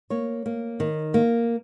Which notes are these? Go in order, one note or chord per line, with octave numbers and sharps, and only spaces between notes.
A#3 C#5
A#3
D#3
A#3